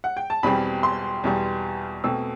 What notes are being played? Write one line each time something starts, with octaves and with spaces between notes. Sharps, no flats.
F#5
G5
A5
E2 B2 G3 C4 B5
C6
E2 B2 G3
B2 A3 C4 E6